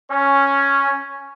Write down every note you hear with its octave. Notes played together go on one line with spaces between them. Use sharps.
C#4